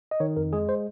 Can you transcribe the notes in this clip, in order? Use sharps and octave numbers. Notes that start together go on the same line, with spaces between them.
D#5
D#3 C#5
F2 A#4
G#3 G#4
C5